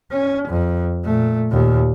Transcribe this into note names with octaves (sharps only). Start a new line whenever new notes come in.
C#4
F2
A#2 A3
D#2 A#2